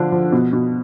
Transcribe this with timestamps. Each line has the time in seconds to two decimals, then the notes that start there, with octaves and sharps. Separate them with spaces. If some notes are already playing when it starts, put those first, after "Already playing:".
Already playing: D3 F3 D4
0.12 F3
0.32 B2
0.53 B2